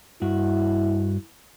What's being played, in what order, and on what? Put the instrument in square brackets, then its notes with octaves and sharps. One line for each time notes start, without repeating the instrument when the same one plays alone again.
[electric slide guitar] G2 F#4 [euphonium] E4